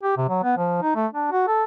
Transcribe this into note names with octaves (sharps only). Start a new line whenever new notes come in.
G4
C3
F#3
B3
F3
D#4
A3
D4
F#4
A4